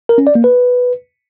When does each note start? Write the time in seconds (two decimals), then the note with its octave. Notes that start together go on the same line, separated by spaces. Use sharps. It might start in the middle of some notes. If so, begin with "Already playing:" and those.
0.09 A#4
0.18 C#4
0.27 D5
0.35 A#3
0.44 B4